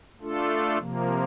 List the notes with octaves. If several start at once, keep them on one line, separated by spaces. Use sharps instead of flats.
A3 D4 F4 A4
C3 F3 A#3